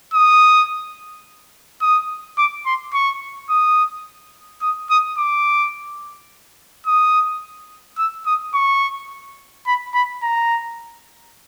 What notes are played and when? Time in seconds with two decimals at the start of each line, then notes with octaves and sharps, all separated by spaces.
0.14 D#6
1.81 D#6
2.37 D6
2.66 C6
2.93 C#6
3.50 D#6
4.62 D#6
4.90 D#6
5.18 D6
6.86 D#6
7.98 E6
8.26 D#6
8.54 C#6
9.66 B5
9.94 B5
10.23 A#5